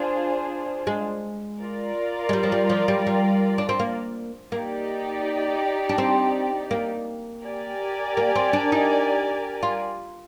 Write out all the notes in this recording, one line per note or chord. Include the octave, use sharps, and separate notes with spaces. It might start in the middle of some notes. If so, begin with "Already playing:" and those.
Already playing: D4 F4 G#4 C5
G#3
F4 A#4 D5
G#3
G3
F3
G3
F3
G3
G3
D4
C4
A#3
A#3 D#4 G4 D5
D4
C4
A#3
G4 A#4 D5 G#5
A#3
C4
D4
D#4
F4